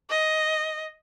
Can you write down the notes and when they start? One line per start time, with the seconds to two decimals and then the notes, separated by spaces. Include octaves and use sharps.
0.10 D#5